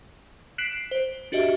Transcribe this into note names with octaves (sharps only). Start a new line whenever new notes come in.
F#6 B6 C7 D7 E7 F#7
D7
C5
D4 F#4 G4 D#5 E5